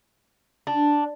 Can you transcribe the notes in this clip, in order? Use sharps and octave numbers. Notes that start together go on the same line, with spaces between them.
D4